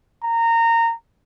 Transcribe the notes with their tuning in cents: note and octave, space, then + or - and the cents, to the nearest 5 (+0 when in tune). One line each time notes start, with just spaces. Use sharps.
A#5 -20